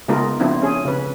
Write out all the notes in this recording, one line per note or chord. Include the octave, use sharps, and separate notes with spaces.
C#3 G#3 B3 D#4 F4 A#4
F3 B3 C4 D4 E4
C#4 G#4
C#3 B4